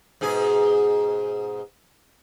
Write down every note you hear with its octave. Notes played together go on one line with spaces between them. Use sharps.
G#2 B2 G#4